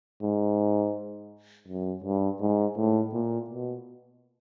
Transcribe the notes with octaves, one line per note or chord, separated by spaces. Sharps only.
G#2
F#2
G2
G#2
A2
A#2
B2